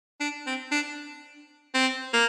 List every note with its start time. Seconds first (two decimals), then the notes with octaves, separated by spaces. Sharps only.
0.20 D4
0.46 C4
0.72 D4
1.74 C4
2.13 A#3